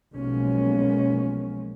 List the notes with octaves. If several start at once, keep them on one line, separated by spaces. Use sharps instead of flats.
B1 F3 G#3 A#3 B3 C#4